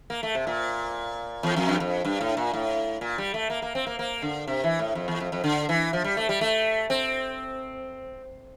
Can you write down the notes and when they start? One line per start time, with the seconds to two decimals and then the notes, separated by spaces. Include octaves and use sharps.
0.10 A#3
0.23 A3
0.35 C3
0.47 A#2
1.43 E2
1.56 F2
1.69 G2
1.80 F2
2.05 G2
2.21 A2
2.37 A#2
2.54 A2
3.01 A#2
3.18 G3
3.34 A3
3.50 A#3
3.62 A#3
3.75 C4
3.87 A#3
3.99 A#3
4.22 D3
4.48 C3
4.64 E3
4.79 A2
4.95 F2
5.08 E2
5.20 F2
5.32 F2
5.44 D3
5.69 E3
5.93 F3
6.04 G3
6.17 A3
6.29 G3
6.41 A3
6.90 C4